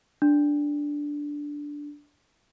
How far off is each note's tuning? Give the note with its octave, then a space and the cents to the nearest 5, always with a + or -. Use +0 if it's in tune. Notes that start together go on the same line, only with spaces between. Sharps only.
D4 -5